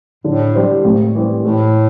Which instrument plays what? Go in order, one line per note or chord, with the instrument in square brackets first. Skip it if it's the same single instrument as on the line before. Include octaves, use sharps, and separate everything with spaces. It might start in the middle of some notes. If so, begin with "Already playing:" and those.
[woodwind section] A2 [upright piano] D3
[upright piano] G3 D4 G4 C5
A2
E3 G3 C4
[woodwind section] A2 [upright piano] A3